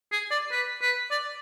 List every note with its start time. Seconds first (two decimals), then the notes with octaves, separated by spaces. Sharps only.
0.12 G#4
0.31 D5
0.52 B4
0.82 B4
1.11 D5